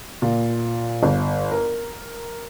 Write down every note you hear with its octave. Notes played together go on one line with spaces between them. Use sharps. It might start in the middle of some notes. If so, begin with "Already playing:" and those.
A#2
G1
A#4